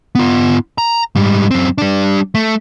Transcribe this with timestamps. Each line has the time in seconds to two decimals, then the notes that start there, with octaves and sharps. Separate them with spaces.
0.15 B3 F4
0.78 A#5
1.16 G#2 G3
1.51 F#2 C4
1.78 G3 D4
2.35 A3